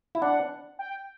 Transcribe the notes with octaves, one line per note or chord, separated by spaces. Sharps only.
E4
D4 F#5
G5